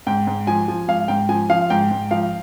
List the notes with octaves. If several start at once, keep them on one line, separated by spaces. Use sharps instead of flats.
G#2 G5
G#2
F3 G#5
F3
G#2 F5
G#2 G5
F3 G#5
F3 F5
G#2 G5
G#2
F3 F5